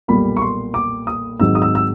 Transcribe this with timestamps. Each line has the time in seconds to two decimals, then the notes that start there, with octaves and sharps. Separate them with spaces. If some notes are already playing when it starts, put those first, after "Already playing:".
0.08 B1 A#2 G3 A#3 B5
0.37 C#6
0.42 C6
0.74 D6
1.07 D#6
1.39 G#1 G#2 D#3 F#3 E6
1.55 D#6
1.62 E6
1.75 E6